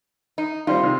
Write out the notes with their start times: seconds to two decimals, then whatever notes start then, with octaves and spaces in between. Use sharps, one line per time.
0.38 D#4
0.67 D#3 G3 C4 F4
0.83 C3 D#3